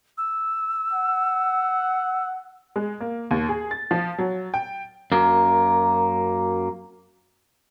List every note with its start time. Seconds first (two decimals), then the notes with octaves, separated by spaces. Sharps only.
0.18 E6
0.93 F#5
2.76 G#3
3.00 A#3
3.31 D#2
3.49 G#4
3.71 A6
3.91 F3
4.18 F#3
4.54 G5
5.12 F#2 A#3